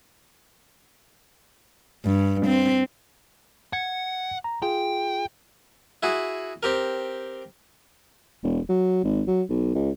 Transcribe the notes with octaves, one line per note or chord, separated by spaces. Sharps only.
G2
C4
F#5 G#6 C#7
A#5
F4 G#4 G5
E4 F#4 G#4
C4 G4 A#4
E1
F#3
G#1
F#3
B1
C#2